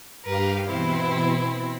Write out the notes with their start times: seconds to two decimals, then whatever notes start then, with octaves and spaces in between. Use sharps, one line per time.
0.24 G2 G4 A#4 B4 F5
0.65 B2 E3 C4 E4